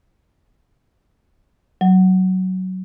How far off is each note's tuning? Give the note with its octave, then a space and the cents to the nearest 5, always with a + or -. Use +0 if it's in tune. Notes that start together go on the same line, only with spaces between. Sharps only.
F#3 +10